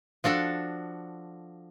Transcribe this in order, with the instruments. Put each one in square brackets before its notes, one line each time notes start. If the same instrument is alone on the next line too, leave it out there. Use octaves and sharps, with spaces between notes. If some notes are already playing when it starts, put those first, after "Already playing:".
[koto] F3 D4 F#4 A4